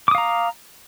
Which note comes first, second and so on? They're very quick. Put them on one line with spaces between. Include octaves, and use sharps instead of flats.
D6 D#6 F5 A#5